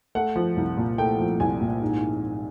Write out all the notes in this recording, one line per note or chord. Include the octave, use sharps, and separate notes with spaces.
A3 F#5
F3
C2
A#2
A3 G5
F3
C2 G#5
A#2
G#2